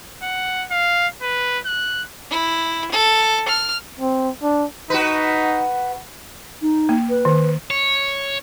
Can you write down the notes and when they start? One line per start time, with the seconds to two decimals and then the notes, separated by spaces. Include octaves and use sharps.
0.23 F#5
0.71 F5
1.22 B4
1.66 F#6
2.30 E4
2.91 A4
3.48 F6
3.99 C4
4.43 D4
4.90 D#4 F#4 B4
6.62 D#4
6.89 A#3
7.10 B4
7.25 D#3
7.70 C#5